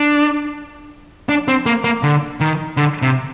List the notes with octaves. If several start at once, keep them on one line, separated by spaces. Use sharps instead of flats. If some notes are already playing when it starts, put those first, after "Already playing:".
Already playing: D4
D4
C4
A#3
A#3
D3
D#3
D3
C3